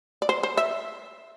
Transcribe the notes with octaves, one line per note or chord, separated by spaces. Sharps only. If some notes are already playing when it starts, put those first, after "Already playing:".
D5
C5
C5
E5